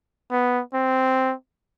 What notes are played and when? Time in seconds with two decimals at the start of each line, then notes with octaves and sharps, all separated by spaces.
0.31 B3
0.73 C4